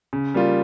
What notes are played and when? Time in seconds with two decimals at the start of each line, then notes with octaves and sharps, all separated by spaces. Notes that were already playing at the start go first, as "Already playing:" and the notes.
0.13 C#3
0.34 G3 A#3 F4